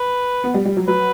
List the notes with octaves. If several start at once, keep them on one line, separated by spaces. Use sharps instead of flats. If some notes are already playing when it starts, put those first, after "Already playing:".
Already playing: B4
B3
G3
G3
F#3
F#3 B4